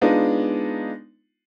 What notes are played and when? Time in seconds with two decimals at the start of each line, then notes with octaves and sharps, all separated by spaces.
0.01 G#3 B3 D4 D#4 F4